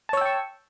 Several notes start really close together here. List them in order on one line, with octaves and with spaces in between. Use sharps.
A5 C#5 E6 G5 C#6